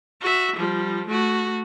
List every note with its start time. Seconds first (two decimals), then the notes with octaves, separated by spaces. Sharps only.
0.21 F#4 E5
0.56 F3 G3
1.07 A3 F#4